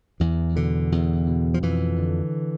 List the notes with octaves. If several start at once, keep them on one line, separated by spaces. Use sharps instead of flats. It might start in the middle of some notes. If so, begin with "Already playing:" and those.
E2 E3
B2 D3
E2
B2
F3
F2 E3
D3